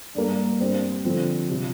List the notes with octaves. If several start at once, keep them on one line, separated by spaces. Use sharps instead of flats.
G2 G3 A#3
G2 G3 C4 G4 C5
D3 F3 C4
C3 F3 D4 F4